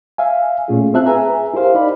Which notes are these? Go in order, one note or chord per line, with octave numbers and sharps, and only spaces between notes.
E5 F5 G#5
A#2 A3 C#4 F4 G#4
C4 F4 E5 A5 F#6
G#4 B4 E5 G#5 A#5
E4 G4 A#4 C5 F5
D#4 D5 B5